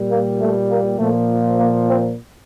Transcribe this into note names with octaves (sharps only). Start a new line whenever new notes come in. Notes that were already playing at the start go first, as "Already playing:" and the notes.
Already playing: A#2 G3
A#3
A3
A#3
A#2 F3 A3
A#3
C4